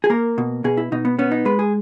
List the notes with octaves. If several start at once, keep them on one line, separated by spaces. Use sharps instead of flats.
G#4
A#3 A#4
B2
B2 G#4
E4
B2 D#4
B3
B3 C#4
D#4
G#3 B4
G#4